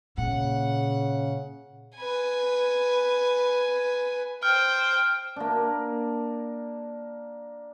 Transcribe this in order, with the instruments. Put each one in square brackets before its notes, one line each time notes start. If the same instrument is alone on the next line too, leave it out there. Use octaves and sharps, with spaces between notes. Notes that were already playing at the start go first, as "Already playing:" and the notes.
[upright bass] A#2 [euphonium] C#3 [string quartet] F#5
[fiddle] B4 G#5
[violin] C5 G5 [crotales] F6
[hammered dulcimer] A#3 D4